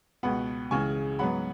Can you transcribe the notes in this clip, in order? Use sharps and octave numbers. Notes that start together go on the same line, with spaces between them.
C#2 B2 B3 F#5 B5
C#2 C#3 E3 G#5 C#6
G#2 F#3 B3 F#5 B5